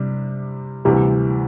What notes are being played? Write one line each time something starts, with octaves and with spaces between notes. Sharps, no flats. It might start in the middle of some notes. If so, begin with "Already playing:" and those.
Already playing: C3 G3 D4
D2 C3 E3 G3